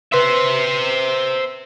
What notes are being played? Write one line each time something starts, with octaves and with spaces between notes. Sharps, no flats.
B4 C5 E5 C6